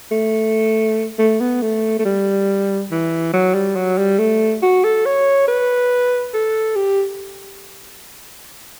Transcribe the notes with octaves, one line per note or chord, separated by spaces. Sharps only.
A3
A3
B3
A3
A3
G3
E3
F#3
G3
F#3
G3
A3
F#4
A4
C#5
B4
A4
G4